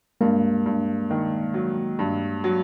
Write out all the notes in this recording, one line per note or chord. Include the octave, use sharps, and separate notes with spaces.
G2 G#3 A#3
G2
D#3
F#3
G2
F#3